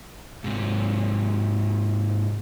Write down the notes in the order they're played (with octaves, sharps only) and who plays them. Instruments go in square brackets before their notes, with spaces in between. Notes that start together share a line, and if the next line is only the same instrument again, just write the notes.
[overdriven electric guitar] G#2 C3